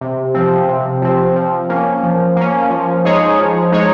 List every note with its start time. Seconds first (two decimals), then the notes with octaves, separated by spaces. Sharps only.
0.01 C3
0.34 F3 C4
0.68 C3
1.02 F3 C4
1.36 F3
1.69 A#3 C#4
2.03 F3
2.36 A#3 C#4
2.70 F3
3.05 G#3 D#4 G#4 C#5
3.39 F3
3.72 G#3 D#4 G#4 C#5